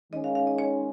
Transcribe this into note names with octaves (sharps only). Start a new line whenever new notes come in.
D#3 G#3 C#4 D#5
F5
F5
D#5
C#5